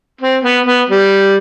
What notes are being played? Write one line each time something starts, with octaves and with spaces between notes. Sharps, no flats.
C4
B3
B3
G3